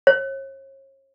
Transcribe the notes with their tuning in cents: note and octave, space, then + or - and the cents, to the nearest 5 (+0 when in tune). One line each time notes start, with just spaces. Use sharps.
C#5 -40